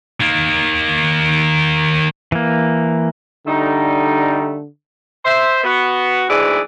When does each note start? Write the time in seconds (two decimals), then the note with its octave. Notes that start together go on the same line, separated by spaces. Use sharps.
0.21 D#3 A#3
2.32 E3 A#3
3.46 D3 G3 A3 D#4
5.25 C5 E5
5.64 B3 F#4
6.29 D2 G#2 E3 E4 G#4 D5